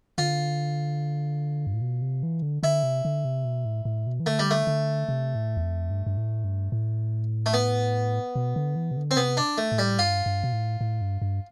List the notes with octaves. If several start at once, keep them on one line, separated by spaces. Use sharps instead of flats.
D3 F4
G2
A2
B2
C3
E3
D3
D3 E4
C3
D3
C3
B2
A2
A2
B2
E3
D3 A3
G3
A3
D3
C3
A2
E2
F2
G2
G2
A2
G2
A2
A3
B3
B2
D3
E3
C3
D3
C4
C3 B3
D4
A3
A2
G3
G2 F4
G2
B2
A2
A2
G2
G2